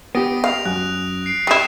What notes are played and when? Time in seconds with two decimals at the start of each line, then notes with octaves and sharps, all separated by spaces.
0.15 B3 G4 D#6 A#6 D7
0.44 F5 F7
0.65 F#2 F#6
1.26 C7 D7
1.47 G3 E4 D#6 D#7 E7